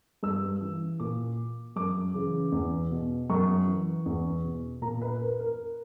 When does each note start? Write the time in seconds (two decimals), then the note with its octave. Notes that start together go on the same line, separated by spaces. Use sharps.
0.23 G2 E6
0.61 E3
1.00 A#2 D6
1.76 F#2 D6
2.14 C#3 E3
2.52 E2
2.91 B2
3.30 F#2 C#6
3.67 E3
4.06 E2
4.44 B2
4.82 A#2 A#5
5.02 B4
5.21 A#4
5.40 A#4